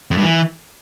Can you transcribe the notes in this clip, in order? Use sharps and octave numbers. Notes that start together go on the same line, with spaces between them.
F2
G2
E3